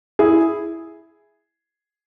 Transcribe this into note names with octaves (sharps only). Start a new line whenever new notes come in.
E4 G#4